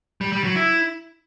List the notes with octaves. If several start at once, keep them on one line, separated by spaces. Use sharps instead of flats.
G3
G3
F#3
E4